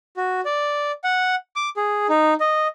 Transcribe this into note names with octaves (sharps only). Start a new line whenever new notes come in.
F#4
D5
F#5
D6
G#4
D#4
D#5